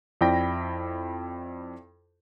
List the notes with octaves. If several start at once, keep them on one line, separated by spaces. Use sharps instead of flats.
F2 E4 D5 G5 B5 A#6